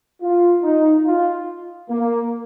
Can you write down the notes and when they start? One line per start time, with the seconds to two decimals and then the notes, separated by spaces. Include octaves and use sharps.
0.21 F4
0.63 D#4
1.06 F4
1.90 A#3